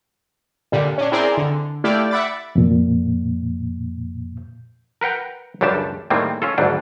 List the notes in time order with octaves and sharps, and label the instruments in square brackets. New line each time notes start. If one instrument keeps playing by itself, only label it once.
[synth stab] A#2 D3 G3
C#4 D4
C4 E4 G#4 A#4 D5 C6
D3
A3 E4 G4 D5 F5 G5
E5 F#5 B5 D6 A6
[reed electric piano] F2 A#2
[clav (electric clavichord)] A#4 B4 F#5 G5 A#5
C#2 F#2 G3 D4 G4 A5
A2 D#3 G3 G#3 A#3 C4
C#4 F4 A4
G#1 D2 G#2 F#3 G3 D4